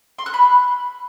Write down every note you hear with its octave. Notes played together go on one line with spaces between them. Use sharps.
C6
F#6
B5